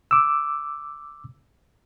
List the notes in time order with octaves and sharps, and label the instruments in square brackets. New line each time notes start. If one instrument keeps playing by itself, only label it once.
[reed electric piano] D6 E6